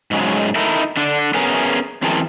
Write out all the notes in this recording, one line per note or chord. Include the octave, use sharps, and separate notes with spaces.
G#2 C#3 F#3 G#3
D#4 E4 A4 A#4
D3 D4
B3 C#4 G#4 A#4
F#2 E3 C4 G#4 A#4 A5